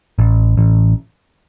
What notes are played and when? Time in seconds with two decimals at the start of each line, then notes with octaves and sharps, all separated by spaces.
0.18 A1
0.57 A1